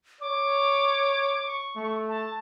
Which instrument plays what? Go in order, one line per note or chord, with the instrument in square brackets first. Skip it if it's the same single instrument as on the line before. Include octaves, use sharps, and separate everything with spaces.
[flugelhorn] C#5 [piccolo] D6
[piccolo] C#6
[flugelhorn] A3
[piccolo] A5